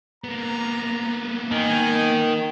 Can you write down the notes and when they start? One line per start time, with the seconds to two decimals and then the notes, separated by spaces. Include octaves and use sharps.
0.24 A#3 B3 A#5
1.52 D#3 G#5